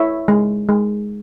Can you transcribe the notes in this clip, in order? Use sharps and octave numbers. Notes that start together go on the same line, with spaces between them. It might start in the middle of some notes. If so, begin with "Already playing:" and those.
Already playing: E4 C#5 E5
G#3
G#3